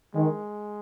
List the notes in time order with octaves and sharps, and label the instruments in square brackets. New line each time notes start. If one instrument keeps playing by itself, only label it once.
[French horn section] D#3 [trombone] G#3